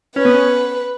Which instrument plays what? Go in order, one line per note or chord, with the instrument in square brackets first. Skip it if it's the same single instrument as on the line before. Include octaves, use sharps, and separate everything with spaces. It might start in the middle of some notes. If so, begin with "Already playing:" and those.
[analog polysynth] C#4 [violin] B4
[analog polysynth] B3
C#4